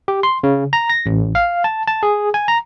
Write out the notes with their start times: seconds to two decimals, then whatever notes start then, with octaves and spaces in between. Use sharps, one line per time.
0.08 G4
0.23 C6
0.43 C#3
0.73 A#5
0.90 A#6
1.06 A1
1.35 F5
1.64 A5
1.87 A5
2.03 G#4
2.34 G#5
2.48 A#5